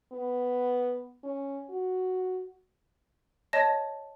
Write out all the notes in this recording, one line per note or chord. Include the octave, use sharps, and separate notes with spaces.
B3
C#4
F#4
C#5 D#5 A5 A#6